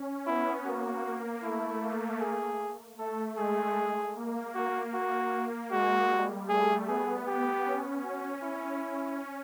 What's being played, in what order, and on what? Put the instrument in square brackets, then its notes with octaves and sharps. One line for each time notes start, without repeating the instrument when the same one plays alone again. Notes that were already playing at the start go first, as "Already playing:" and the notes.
Already playing: [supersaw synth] C#4
[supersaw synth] B3 [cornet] E4
[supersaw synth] A#3 [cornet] F#4
[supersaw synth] A3 [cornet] E4
[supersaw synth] A#3
[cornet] G#4
[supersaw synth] A3 [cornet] A4
[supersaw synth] G#3 [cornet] G#4
[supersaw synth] A#3
[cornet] F#4
[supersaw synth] A#3 [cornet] F#4
[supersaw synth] A#3
[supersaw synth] G#3 [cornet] F#4
[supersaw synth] G3
[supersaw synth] A3 [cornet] G#4
[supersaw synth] B3 [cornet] G#4
[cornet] G4
[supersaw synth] C#4
[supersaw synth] C#4 [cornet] F#4
[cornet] E4
[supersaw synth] C#4